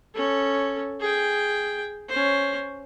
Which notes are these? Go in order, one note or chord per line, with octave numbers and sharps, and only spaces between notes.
C#4 A4
G#4 G5
C#4 C5